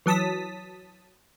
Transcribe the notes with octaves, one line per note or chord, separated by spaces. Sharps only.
E3 F#3 A5 D#6 B6